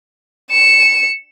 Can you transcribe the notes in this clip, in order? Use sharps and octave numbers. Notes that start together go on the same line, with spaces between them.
C#7 E7